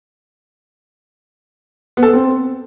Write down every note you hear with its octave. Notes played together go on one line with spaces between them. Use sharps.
B3
A4
B3
C4